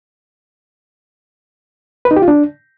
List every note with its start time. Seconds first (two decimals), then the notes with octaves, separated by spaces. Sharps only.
2.05 B4
2.11 D#4
2.16 G4
2.22 F4
2.28 D4